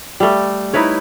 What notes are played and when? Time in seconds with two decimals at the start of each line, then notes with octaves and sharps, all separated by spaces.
0.20 G3 A3
0.73 D#4 E4 B4 C#5